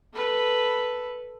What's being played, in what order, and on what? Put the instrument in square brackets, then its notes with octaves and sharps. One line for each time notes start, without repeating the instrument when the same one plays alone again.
[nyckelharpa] A4 B4